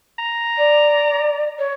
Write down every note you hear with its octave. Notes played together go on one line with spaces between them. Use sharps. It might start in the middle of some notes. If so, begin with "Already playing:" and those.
A#5
D5
C#5